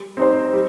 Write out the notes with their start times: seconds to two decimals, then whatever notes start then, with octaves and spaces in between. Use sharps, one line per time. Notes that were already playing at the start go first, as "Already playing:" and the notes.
Already playing: G3
0.17 C4 D#4 G4 C5
0.53 G3